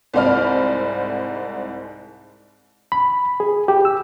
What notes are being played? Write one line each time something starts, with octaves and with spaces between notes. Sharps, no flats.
C2 G#2 C5 D5 B5 F6
B5
G#4
G4
E6